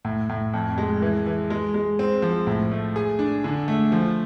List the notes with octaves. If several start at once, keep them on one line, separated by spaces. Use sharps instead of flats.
A2
A2
F2
G#3
E3
E3
G#3
G#3
C4
F3
A2
A3
G#4
D4
D3
A3
F3